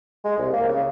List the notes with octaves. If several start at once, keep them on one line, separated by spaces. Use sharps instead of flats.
G#3
C2
A#3
C#3